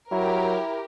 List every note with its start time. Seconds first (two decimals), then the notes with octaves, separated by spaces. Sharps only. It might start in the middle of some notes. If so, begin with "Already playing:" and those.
0.12 F#3 E4 G4 A#4